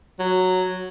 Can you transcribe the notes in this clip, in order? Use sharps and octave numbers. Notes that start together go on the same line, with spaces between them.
F#3